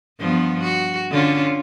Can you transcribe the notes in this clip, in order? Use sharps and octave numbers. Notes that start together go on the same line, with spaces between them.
G2 F3 B3
F#4
D3 C#4 F4